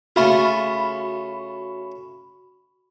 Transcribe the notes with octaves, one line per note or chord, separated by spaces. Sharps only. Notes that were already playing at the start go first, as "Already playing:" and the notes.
C#3 A3 F4 F#4 B5 C#6